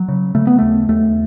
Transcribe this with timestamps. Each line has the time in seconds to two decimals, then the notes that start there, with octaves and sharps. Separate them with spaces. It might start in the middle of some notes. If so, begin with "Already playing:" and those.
Already playing: F#3
0.08 C#3
0.35 C#3 A3
0.47 B3
0.59 D#2 A3
0.88 D#2 A3